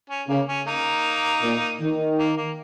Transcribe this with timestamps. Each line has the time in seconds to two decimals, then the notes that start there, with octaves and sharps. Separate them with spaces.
0.10 C#4
0.28 C#3 A#3
0.48 C#4
0.66 A#3 D#4
1.43 A#2
1.81 D#3
2.19 A#3
2.37 A#3